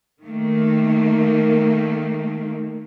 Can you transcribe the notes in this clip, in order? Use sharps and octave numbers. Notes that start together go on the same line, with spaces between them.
D#3 A3 A#3